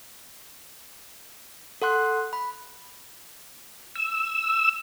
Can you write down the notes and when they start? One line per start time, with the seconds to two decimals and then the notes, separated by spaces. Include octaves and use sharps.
1.82 A4 F#5 C6 F#6
2.33 B5
3.95 E6